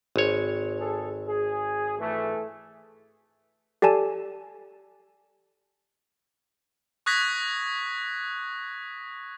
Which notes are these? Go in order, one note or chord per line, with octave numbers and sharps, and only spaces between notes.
G#1 C#5
G#4 A4
G#4
E3 A3
G4 A4 D5 G#5 A5
C#6 D#6 F#6 G#6 A#6 B6